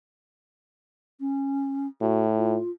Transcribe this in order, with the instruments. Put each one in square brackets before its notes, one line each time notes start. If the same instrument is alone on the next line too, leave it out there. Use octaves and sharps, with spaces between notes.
[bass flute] C#4
[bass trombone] A2 [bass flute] F#4
[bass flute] F4